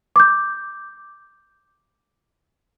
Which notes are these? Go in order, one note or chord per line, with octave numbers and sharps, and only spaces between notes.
D6 G6